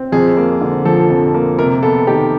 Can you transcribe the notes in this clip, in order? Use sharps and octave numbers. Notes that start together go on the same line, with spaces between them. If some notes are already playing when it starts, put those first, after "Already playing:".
Already playing: C4
F2 G#4
A#3
D3
F3 A4
F2
A#3
C3 A#4
B3 A4
D#3 G4